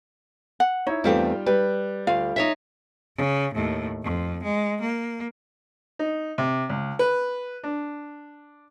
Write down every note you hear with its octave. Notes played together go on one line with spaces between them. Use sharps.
F#5
D#4 E4 C#5
E2 G3 A3 C4 F4 G4
G3 B4
D2 F4 F5
D#4 C#5 E5
C#3
D#2 A2
F2
G#3
A#3
D#4
C3
C#2
B4
D4